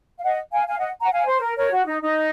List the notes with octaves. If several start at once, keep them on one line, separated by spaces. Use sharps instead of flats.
F5
D#5 F#5
F5 G#5
F5 G#5
D#5 F#5
F#5 A#5
F5 G#5
C5
A#4
A#4 C#5
F#4
D#4
D#4